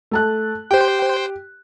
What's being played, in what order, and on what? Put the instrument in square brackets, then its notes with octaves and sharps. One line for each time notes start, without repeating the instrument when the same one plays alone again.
[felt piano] A3 A5 F#6
[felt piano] G4 [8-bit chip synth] C5 G5